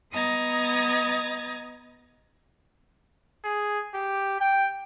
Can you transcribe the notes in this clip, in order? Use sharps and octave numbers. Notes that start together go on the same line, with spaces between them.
B3 D#5 A#5 D#6 G#6 A6
G#4
G4
G5